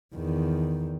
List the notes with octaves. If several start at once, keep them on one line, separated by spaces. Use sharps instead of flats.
E2 D#3